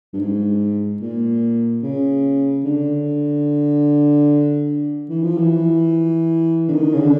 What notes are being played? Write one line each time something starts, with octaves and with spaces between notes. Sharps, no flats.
G2
G#2
A#2
C#3
D3
E3
F3
E3
D3
D#3
C#3
D3